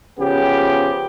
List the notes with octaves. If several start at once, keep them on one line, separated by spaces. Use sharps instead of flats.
C#3 F3 B3 G4